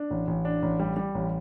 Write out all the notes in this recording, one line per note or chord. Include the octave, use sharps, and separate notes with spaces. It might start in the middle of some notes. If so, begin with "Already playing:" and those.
Already playing: D4
A1
A1
D4
A1
G3
G3
A1